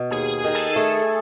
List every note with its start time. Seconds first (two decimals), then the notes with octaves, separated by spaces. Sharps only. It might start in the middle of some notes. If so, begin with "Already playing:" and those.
Already playing: B2
0.11 D#2 G#4
0.34 G#4
0.45 D#3
0.55 A4
0.76 A3